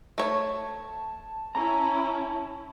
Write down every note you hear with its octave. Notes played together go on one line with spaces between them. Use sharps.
A3 C#5 A5
C#4 E4 A#5